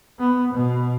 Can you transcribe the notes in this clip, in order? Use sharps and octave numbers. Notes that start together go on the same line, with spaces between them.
B3
B2